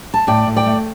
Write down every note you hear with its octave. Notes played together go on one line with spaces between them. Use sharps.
A5
A2 D5 G5
A2
D5 G5
A3